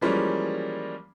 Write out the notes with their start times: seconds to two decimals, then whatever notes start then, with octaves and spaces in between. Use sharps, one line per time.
0.01 E3 F3 G3 G#3 A#3 C#4